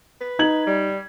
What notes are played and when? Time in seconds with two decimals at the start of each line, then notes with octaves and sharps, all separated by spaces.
0.21 B4
0.39 D#4 G#6 F#7
0.67 G3